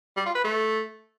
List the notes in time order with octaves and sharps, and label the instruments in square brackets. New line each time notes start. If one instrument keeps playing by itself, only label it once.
[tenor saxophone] G3
F4
B4
A3